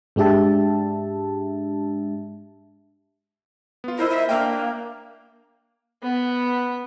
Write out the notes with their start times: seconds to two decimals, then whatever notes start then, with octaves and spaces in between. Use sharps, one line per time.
0.16 G#2 G#3 D4 G4 E5 A5
3.84 B3 F4
3.99 E4 A#4 C5 D#5
4.10 E5
4.29 A#3 D4 E5 G5
6.03 B3